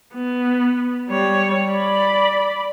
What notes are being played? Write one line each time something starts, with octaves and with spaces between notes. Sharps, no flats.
B3
G3 C#5
D5 B5